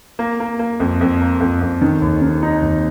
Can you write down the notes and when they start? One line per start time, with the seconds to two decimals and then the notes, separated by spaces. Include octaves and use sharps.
0.19 A#3
0.40 A#3
0.59 A#3
0.80 F2
1.01 F2
1.21 A#3
1.40 F2
1.61 F2
1.82 D#3
2.02 D#2
2.22 D#3
2.43 D#4
2.62 D#2